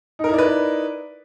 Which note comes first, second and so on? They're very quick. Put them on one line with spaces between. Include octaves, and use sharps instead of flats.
D#4 A#4 E4 D5 B4